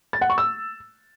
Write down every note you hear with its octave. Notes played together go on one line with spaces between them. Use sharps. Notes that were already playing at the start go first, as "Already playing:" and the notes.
A6
F#5
C#6
E6